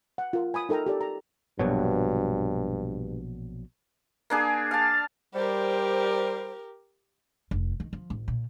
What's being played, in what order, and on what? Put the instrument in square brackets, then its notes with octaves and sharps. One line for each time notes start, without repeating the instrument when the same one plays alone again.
[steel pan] F#5
F4 A#4
G#5 B5 D#6
D#4 A4 A#4 G5 A#5
G4 A4 D5
A#5
[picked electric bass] A#1 B2 F#3 [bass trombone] G2
[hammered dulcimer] A#3 D4 G#4
F5 A5
[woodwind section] G3 C5 [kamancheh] G4 A#4
[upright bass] F1
D#3
F3
A1
A#2